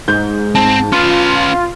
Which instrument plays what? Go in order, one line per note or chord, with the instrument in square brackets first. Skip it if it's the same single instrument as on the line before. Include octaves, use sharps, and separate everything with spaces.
[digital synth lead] G#2 [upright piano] G6
[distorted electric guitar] C4 [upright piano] A5
[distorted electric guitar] C#4 B4 [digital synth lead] F4